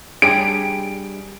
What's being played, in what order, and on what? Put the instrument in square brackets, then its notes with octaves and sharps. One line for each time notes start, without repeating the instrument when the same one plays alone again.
[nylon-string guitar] G3 D4 G#4 [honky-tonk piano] D7